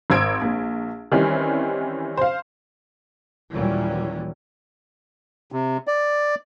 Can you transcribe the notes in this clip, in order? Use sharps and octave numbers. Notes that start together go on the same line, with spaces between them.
G#1 C5 E6 G#6 D7
A#1
D#3 E3 G3 C4 C#4
C5 F5
D#2 A#2 E3 F#3 G3 C#4
C3
D5